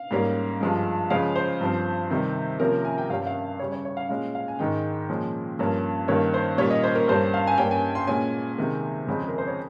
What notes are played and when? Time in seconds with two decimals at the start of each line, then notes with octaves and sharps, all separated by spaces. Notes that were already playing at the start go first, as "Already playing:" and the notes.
Already playing: F5
0.11 G#2 G3 A#3 C#4
0.61 G2 F3 G#3
1.10 C#3 F3 G#3 C#4 F5
1.36 C5
1.61 G2 F3 C4
2.11 C3 D#3 G3
2.60 C3 F3 A#3 C#4 A#4
2.85 G#5
2.98 G5
3.09 G2 G3 C#4 F5
3.27 F5
3.59 C#3 G3 C#4 C#5
3.72 C#5
3.85 C#5
3.97 F5
4.09 A#2 G#3 C#4 F5
4.35 F5
4.48 G#5
4.59 G#2 D#3 G#3 G5
5.09 A#2 F3 G#3 C#4
5.59 G2 F3 A#3 C#4
6.08 G2 D#3 A#3 C#4 C#5
6.34 C5
6.58 A#2 G3 A#3 C#4 C#5
6.70 D#5
6.83 C5
6.95 A#4
7.08 G2 G3 A#3 C#4 C5
7.34 F5
7.47 G#5
7.58 G2 G3 A#3 C#4 G5
7.71 G#5
7.95 C6
8.07 A#2 G#3 C#4 G#5
8.58 C3 D#3 G#3
9.07 F2 C#3 G#3 C4
9.19 G#4
9.28 A#4
9.38 C5
9.47 C#5